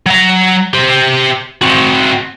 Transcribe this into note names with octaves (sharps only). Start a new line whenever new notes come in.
F#3 A#5
G4 C5
C4 F#4